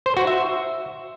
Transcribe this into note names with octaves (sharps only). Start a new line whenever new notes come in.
C5
F#4
E5